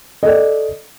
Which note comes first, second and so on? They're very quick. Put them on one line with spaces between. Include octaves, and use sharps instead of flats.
D#5 A4 D5